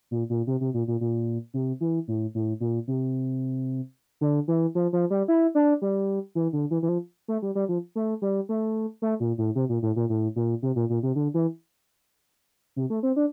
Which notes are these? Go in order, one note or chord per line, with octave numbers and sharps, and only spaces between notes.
A#2
A#2
C3
C3
A#2
A#2
A#2
C3
E3
A2
A2
A#2
C3
D3
E3
F3
F3
G3
E4
D4
G3
E3
D3
E3
E3
F3
A3
G3
G3
F3
A3
G3
A3
A3
A#2
A2
C3
A#2
A2
A#2
A2
A#2
C3
A#2
A#2
C3
D3
E3
C3
A3
C4
D4